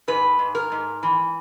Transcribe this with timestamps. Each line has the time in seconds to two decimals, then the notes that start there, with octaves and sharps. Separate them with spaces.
0.08 G#2 B4
0.39 G#2
0.55 A#4
0.72 G#2
1.03 E3